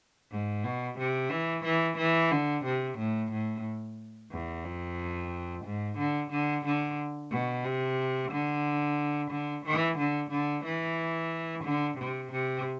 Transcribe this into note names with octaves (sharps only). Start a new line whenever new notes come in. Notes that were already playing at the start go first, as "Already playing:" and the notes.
G#2
B2
C3
E3
E3
E3
D3
C3
A2
A2
E2
F2
G#2
D3
D3
D3
B2
C3
D3
D3
E3
D3
D3
E3
D3
C3
C3